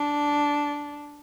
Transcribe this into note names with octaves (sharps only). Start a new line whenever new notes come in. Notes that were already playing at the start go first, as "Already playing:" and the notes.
Already playing: D4